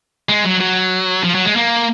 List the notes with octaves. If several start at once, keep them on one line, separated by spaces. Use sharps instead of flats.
G#3
F#3
F#3
F3
F#3
G#3
A#3